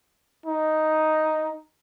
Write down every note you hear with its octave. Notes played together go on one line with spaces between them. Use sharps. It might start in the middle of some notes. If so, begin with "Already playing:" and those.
D#4